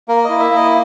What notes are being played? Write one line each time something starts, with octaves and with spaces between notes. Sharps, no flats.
A#3 A#4
E4 D#5
E5
A#3 D#5